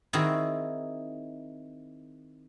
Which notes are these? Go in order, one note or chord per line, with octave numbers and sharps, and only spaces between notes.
D#3 C4 E4 F#4 G#4